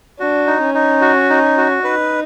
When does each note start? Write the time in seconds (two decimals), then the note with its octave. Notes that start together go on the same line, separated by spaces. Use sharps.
0.19 D4 F#4
0.47 D#4
0.61 C#4
0.74 D#4
1.01 F#4
1.30 D#4
1.57 F#4
1.84 D#4 B4